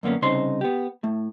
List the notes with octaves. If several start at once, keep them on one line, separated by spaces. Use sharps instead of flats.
F#2 D3 A#3 B3 C#4
C2 C#3 C4 D#4 C5 C6
B3 G4
A2 A3